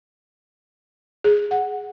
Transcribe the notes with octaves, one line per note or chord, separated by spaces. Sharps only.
G#4
F#5